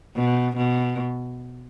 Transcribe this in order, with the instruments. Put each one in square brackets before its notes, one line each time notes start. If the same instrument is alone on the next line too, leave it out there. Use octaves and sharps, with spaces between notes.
[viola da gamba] B2
B2